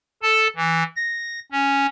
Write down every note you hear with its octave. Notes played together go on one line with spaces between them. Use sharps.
A4 A5
E3
A#6
C#4